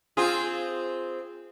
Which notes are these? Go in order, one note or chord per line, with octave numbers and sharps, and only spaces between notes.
C4 F4 G#4